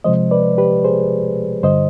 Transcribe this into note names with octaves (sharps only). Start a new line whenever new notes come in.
C3 F3 G#3 C5 D#5
B4 D5
G4 B4
G#4 C5
G2 D3 G3 C5 D#5